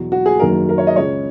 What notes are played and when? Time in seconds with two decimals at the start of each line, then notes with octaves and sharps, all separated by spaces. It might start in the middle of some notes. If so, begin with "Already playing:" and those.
Already playing: E2 B2 F#3
0.12 F#4
0.26 G#4
0.40 F#1 F#2 D#3 F#3 A#4
0.69 A#4
0.78 C#5
0.87 D#5
0.96 C#2 C#3 G#3 C#5